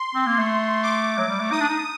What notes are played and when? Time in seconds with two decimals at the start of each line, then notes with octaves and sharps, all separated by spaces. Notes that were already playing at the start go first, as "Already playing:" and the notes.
Already playing: C6
0.15 C4
0.27 A#3
0.38 A3
0.83 D6
1.18 F#3
1.29 G3
1.40 A3
1.52 D#4 D#6
1.60 D4
1.69 D#4